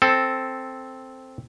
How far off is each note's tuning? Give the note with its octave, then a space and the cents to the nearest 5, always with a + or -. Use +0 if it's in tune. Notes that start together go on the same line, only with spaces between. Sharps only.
C4 +0 A4 +0